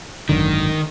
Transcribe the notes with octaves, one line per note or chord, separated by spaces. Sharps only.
G#1 F#2 D3 D#3